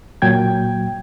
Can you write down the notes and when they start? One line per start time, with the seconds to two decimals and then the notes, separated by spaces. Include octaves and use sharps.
0.22 A#2 F#3 G5 G#6